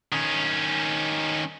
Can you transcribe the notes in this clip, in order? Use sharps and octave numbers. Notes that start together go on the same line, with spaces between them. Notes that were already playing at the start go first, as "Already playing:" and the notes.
D#3 C#4